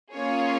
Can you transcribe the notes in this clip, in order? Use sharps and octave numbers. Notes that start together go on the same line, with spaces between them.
A#3 C#4 F4 G#4 C#5